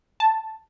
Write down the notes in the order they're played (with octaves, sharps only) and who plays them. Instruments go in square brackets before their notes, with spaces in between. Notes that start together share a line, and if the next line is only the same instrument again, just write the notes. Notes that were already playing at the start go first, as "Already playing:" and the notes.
[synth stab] A5